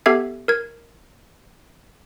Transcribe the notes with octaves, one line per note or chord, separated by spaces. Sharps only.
B3 G4 A4 E5 G#6 C7
A#4 G#6